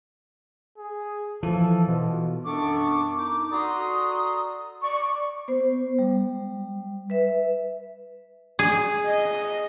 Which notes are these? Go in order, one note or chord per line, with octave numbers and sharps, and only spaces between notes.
G#4
E3 F3 A4
B2 F4
F#2 B3 D4 A4 C#6 D6
D#4 D6
F#4 A4 D5 A#5 C6 D#6
D5 C#6
B3 C5
G3
B4 E5
G#4
D#5